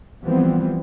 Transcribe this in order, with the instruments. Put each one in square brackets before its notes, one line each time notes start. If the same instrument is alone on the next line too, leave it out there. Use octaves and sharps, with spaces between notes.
[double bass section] E3 F3 G3 B3 C4